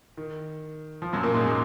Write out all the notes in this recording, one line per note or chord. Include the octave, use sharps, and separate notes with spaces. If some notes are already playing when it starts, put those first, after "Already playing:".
D#3
F3
F#2 F#3
A#2 A#3
G#2 G#3
F#3